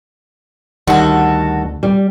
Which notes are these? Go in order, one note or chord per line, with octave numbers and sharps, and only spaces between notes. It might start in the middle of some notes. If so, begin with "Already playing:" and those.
D2 D#3 G3 F#4 A4
G3